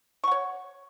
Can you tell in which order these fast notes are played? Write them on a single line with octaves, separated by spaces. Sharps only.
C#6 F#5 C#5